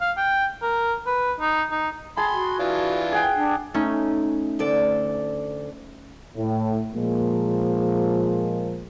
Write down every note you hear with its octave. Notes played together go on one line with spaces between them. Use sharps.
F5
G5
A#4
B4
D#4
D#4
G#4 A5 B5 C6
F#4
E3 D4 F4
G#4 F#5 G5
D4
A3 C#4 D#4
D2 A4 D5
A2
A#2 F3 G#3 A#3